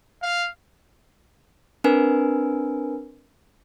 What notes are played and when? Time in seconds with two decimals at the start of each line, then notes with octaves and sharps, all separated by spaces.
0.22 F5
1.84 C4 D4 A#4 B4 G#5